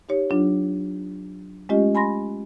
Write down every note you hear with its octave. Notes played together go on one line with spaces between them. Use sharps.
D#4 G4 C#5
F#3 D4 F4
G#3 A3 C#4 F4 G4 D#5
G#5 B5 C6 A#6